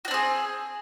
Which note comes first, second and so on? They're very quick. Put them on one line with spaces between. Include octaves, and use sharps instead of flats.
F#4 D4 C4 G#4